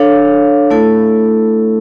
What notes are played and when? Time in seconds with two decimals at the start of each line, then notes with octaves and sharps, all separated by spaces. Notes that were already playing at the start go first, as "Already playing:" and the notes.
Already playing: D4 A4 C#5 F5
0.70 A3 E4 A4